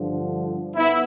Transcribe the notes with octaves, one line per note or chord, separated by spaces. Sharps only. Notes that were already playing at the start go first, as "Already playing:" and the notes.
Already playing: G2 D3 F3
B3 E4